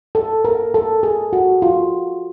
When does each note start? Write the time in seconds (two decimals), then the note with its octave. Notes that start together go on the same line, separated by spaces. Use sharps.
0.15 A4
0.45 A#4
0.74 A4
1.03 G#4
1.33 F#4
1.62 F4